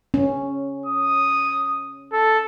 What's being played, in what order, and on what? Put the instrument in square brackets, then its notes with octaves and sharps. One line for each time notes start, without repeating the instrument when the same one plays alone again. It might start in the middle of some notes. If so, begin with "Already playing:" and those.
[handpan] C#4
[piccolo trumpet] D#6
A4